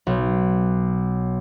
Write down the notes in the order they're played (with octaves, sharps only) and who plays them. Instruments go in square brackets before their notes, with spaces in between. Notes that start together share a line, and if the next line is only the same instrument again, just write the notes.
[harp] B1